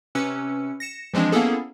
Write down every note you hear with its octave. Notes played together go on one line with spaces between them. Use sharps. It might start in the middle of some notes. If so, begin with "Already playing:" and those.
C3 C#4 B4 E6 C#7
A#6 C#7 E7
E3 F3 G#3 C4 D4
A#3 B3 C#4 E4 G#4 A4